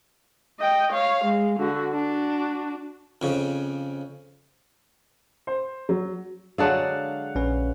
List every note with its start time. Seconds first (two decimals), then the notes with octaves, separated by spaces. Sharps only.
0.60 D#5 G5
0.92 C#5 F5
1.25 G#3
1.60 D3 F#4
1.92 D4 F#4
3.22 F2 C#3
5.47 C5
5.89 F#3
6.58 D3 F#3 G#3 G#4 D5 F5 F#5 A5
7.35 A#1 C#4 B4